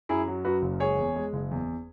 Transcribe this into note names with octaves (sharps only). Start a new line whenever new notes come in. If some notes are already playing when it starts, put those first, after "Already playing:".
F#2 E4 G#4
F#3
F#2 F#4 B4
F#1
G#3 G#4 C#5
E2
G#3
F#1
E2